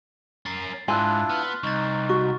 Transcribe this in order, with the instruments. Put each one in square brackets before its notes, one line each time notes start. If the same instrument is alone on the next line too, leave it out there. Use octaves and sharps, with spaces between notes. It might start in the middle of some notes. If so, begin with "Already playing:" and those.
[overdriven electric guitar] C#4 A#4 [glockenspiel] A6 C7
[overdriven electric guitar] G#2 [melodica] D4 E4 F4 [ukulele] G#5 [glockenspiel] C6 F#6
[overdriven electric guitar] B3 [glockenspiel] F6
[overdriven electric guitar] C2 [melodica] D#4 [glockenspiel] C#6 A6
[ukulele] F#4 [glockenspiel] C#6